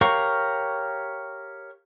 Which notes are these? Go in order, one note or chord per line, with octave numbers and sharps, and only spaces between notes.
G4 A#4 C#5 F5 C#6